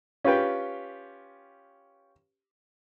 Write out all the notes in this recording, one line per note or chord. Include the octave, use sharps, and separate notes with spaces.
C#4 F4 G4 B4 G5